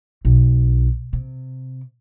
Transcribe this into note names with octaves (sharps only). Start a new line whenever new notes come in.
B1
C3